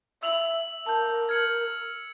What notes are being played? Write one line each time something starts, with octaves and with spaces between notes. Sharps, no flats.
E5 E6 F7 F#7
A#4 A5 G6
F6 G#6 C#7 F#7